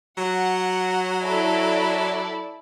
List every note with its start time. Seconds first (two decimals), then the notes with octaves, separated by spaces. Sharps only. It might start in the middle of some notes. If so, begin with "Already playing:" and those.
0.18 F#3 F#5
1.24 E4 A4 D5